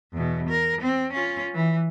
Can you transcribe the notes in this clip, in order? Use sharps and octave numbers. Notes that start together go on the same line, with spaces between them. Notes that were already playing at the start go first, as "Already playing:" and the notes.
E2 B2
A#4
C4
C#4 F4
E3